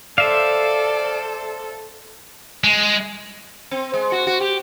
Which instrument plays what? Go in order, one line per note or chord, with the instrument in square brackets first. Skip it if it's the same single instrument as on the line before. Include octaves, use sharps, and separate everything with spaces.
[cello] A4 [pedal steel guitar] C5 E5 F5 [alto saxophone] D5
[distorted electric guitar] G#3
[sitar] C4
G#3
F#4
F#4
G4